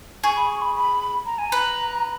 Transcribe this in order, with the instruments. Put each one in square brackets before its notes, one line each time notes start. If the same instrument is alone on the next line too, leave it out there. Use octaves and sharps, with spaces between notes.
[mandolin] G#4 [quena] C#6
[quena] B5
C#6
B5
B5
A#5
G#5
[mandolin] B4 [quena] A#5